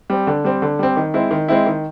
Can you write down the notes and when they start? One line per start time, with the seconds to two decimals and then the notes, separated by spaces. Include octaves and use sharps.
0.10 G3 C4
0.27 D3
0.44 G3 C4
0.62 D3
0.79 G3 C4
0.96 D#3
1.14 G#3 C4 E4
1.31 D#3
1.48 G#3 C4 E4
1.66 D#3